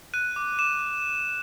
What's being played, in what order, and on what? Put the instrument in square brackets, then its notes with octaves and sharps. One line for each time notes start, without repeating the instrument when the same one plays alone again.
[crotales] F#6 D#7
D6
D6 E7